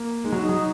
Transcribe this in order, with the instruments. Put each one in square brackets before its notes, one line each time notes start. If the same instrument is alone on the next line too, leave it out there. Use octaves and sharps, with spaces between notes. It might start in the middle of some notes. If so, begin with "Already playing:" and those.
Already playing: [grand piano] A#3
[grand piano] G#3 [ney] D#4
[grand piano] F#3
[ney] D#4
[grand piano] F#3